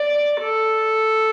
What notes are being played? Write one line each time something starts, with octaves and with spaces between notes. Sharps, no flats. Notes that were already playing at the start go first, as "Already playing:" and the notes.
Already playing: D5
A4